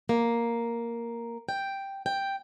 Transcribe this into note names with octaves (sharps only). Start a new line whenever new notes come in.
A#3
G5
G5